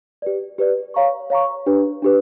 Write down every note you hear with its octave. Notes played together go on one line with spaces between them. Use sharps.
G4 B4 D5
G4 B4 D5
C#5 F5 A#5 C#6
C#5 F5 A#5 C#6
D4 G4 B4
D4 G4 B4